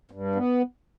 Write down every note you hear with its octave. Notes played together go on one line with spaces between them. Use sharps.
G2
B3